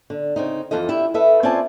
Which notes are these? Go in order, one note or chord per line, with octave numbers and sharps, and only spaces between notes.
D3
C#3 C4 D#4
F2 E3 F4 A4 D#5
D4 E4 G4 E5
A4 B4 D#5 E5
C4 C#4 F4 D5 G#5 A5